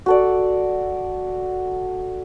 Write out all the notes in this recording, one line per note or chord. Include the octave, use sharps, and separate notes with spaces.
F#4 A4 D5